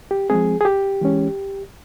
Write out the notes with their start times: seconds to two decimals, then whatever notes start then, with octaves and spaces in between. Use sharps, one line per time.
0.11 G4
0.29 F3 G#3 C4 G#4
0.61 G#4
0.65 G4
1.01 E3 G#3 C#4